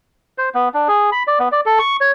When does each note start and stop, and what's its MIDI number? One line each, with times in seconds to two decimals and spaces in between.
0.38 0.49 72
0.54 0.69 59
0.74 0.88 62
0.88 1.10 68
1.12 1.23 83
1.27 1.39 74
1.39 1.49 59
1.52 1.61 74
1.66 1.79 69
1.79 1.97 85
2.01 2.12 73